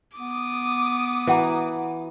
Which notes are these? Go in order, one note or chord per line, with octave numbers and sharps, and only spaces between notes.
B3 D6 D#6
E3 F#4 F#5 A#5